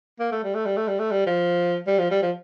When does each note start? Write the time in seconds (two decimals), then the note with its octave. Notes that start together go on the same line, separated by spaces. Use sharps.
0.20 A#3
0.32 A3
0.44 G3
0.54 A3
0.65 G3
0.77 A3
0.87 G3
0.99 A3
1.11 G3
1.26 F3
1.87 G3
1.99 F3
2.10 G3
2.22 F3